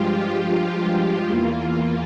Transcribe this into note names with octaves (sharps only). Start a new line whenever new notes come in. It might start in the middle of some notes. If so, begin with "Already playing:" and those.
Already playing: G2 F3 G#3 F4 G4
F4
E2 E3 A#3 F4